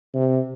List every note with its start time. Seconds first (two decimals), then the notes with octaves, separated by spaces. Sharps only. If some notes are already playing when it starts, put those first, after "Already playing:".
0.14 C3